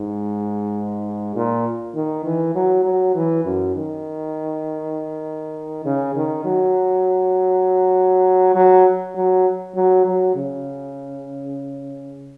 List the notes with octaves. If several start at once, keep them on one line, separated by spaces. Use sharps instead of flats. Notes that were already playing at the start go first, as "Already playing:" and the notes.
Already playing: G#2
A#2
D#3
E3
F#3
F#3
E3
F#2
D#3
C#3
D#3
F#3
F#3
F#3
F#3
F#3
C#3